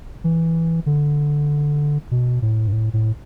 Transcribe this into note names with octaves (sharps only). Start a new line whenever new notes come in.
E3
D3
B2
A2
G2
A2
A2